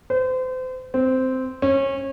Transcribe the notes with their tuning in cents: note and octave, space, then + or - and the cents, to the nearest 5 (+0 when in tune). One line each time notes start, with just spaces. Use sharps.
C5 -35
C4 -10
C#4 -25